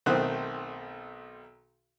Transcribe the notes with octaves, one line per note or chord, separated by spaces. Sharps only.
B1 D#3 A3 C4 C5 F#6